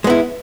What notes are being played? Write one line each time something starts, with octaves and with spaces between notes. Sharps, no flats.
G#3 B3 E4